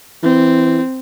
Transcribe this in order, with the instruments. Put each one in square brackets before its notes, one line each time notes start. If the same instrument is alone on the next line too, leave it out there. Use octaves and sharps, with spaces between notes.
[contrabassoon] E3 [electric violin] C4